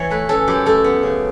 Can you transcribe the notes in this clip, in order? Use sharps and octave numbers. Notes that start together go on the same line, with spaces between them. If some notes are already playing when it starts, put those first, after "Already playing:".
Already playing: E3 C#5
A3 B4
C#4 A4
F#2 G4
A3 A4
B3
C#3